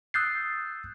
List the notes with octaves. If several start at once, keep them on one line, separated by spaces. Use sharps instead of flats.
D#6 E6 F#6 G6 A6 C7